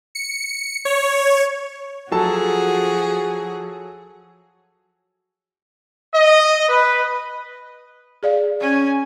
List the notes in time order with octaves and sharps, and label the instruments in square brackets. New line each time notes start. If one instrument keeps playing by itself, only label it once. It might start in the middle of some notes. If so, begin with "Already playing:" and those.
[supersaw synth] C#7
C#5
[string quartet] F3 F#4 G#4 [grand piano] F#3 A4 A5
[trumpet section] D#5
B4
[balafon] G#4 D5 F5
[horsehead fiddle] C#4 G#5